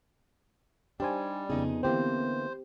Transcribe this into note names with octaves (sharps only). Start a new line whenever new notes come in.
G3 D4 D#4 G4 C5 G#5
F2 C#3 B3 D#4 G#4
D3 E3 A#3 C4 G4 C5